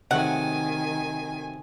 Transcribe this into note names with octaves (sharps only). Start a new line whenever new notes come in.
C3 D#3 F#3 A3 F#5 G#5